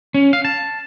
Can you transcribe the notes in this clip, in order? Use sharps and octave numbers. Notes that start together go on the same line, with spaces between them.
C#4
F5
A5